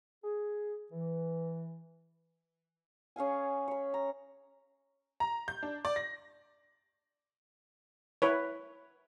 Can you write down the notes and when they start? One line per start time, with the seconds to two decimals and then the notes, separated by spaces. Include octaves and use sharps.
0.24 G#4
0.92 E3
3.16 C#4 G#4 F5 G#5
3.68 C#5 B5
3.94 A#5
5.20 A#5
5.48 G6
5.63 D4
5.85 D5
5.96 A#6
8.22 E4 B4 C#5